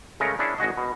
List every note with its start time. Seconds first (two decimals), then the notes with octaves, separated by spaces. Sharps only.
0.20 C#3 G#3 A3 C#4 A#4
0.39 C#4 D4 E4 G#4
0.58 G#1 G#3 F#4 D#5
0.78 B2